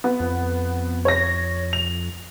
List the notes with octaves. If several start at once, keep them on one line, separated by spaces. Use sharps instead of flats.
B3
F2
C#5 A#6
F7